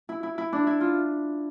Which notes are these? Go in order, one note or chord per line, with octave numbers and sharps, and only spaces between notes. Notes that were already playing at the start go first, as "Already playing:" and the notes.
E4
E4
E4
D4
E4
F4